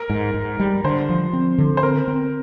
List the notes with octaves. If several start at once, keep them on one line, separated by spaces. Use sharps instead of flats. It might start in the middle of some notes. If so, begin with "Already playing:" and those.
Already playing: A#4
G#2
G#2
G3
D3 C5
F3
C4
D3
C5
C4 A#4
C4